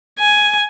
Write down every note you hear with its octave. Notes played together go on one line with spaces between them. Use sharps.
G#5